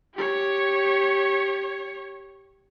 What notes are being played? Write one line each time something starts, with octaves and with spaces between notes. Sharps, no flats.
G4 C#5